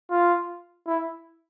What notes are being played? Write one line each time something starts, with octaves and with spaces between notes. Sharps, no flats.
F4
E4